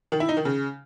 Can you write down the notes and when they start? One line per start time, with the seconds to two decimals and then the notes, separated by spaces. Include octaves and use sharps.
0.12 D#3
0.20 E4
0.29 D#4
0.37 D#3
0.45 C#3